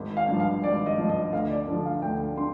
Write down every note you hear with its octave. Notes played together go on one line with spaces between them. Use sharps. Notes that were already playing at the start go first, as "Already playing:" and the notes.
Already playing: G#1
F5
G2 F3
F5
G#1 D5
D#5
G2 F3
D#5
D2 F5
D5
D3 F3
F5
D2 G5
D3 C6